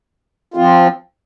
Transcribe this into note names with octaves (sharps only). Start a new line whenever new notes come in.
F3 C4 F4